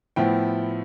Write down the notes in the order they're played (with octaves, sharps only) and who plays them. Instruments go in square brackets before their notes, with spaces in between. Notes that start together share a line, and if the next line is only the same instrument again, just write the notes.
[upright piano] A2 F3 B3 E4 G5